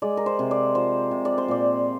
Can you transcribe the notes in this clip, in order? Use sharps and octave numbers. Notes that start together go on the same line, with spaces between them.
G#3 D5
A#4
C5
C3
D5
F3 C5
C3
D5
C5
A#2 D5